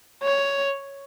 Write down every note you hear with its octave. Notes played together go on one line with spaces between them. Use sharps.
C#5